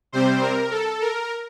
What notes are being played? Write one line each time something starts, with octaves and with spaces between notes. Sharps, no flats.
C3 G3 C4 C5
A#4
A4
A#4